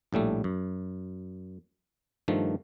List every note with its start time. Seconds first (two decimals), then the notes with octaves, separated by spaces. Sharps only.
0.13 A#1 A2 G3 A3
0.44 F#2
2.28 G2 D#3 F3 A3